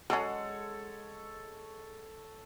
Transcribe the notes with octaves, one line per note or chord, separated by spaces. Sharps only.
F#3 G#3 C#4 A4 C#5 F#5